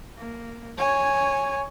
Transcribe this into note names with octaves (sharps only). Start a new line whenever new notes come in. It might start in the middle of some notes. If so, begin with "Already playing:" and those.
A#3
C#5 G#5